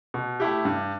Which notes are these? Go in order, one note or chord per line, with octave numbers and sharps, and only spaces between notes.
B2
A3 E4 G4
G2